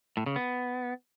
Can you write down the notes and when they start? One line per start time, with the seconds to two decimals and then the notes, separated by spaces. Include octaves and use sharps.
0.17 A2
0.26 C#3
0.36 B3